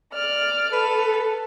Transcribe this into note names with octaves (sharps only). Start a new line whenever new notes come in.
D5 F6
A4 B4